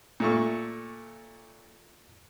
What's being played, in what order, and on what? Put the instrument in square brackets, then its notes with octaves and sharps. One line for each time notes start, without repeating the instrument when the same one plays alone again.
[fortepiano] A#2 A3 C#6